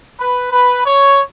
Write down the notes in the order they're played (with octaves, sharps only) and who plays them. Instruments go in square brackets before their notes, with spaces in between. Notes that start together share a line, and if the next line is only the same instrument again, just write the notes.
[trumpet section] B4
B4
C#5